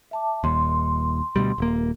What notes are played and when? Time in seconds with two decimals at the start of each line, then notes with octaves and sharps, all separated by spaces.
0.11 E5 A5 D6
0.44 D#1 D#2 C6
1.36 D2 B2 G3
1.58 D#1 A#3